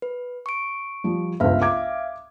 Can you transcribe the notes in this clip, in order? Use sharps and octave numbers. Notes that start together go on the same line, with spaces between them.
B4
C#6 D7
F3 G3
G1 C#2 E5 F5 F6
D6 G#6